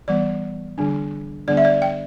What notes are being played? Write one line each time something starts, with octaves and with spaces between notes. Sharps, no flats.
E3 G3 B3 D5
D3 G3 D4
D3 G3 B3 D4 D5
E5
D5
G5